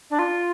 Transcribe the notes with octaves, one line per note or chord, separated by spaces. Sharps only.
D4
F4